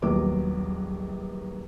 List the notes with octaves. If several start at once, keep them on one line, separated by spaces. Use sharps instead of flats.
D#1 A#1 D#2 F#3 B3 D6